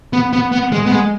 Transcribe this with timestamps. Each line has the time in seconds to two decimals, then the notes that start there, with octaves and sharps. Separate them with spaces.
0.13 B3
0.33 B3
0.52 B3
0.72 G#3
0.86 B3
0.92 G#3